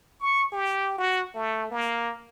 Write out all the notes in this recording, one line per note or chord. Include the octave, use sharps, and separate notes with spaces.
C#6
G4
F#4
A3
A#3